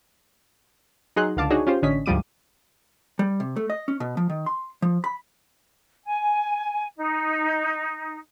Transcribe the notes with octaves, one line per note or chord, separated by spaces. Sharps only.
F#3 D#4 G#4 C6 F#6
C#2 D3 F5 A5 D6
D4 D#4 F#4 G#4 C#5
C#4 F4 G4 C5
A1 D3 C#4 D#5 B6
D2 G#2 F3 G3 D6 D#7
G3
C3
A3
D#5
C#4
B2
F3
D#3
C6
F3
B5
G#5
D#4